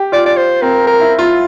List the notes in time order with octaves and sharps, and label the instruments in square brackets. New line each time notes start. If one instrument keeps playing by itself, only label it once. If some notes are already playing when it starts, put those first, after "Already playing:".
Already playing: [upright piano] G4
[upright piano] F4 [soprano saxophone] D5
[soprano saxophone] D5
C5
[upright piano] C4 [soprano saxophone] A#4
[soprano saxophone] A#4
[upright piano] E4
F4